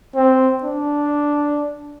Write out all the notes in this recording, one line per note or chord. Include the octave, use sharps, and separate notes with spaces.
C4
D4